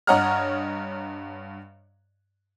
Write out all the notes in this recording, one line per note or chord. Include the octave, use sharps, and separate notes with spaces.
G2 C#5 D#5 F#5 A#5 F6